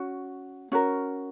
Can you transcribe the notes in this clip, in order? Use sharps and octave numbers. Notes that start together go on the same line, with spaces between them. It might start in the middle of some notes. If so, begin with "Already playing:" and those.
Already playing: C#4 F#4
C#4 F#4 A#4